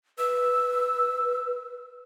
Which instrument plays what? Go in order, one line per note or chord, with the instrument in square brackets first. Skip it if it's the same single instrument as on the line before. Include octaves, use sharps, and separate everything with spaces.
[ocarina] B4 [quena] E6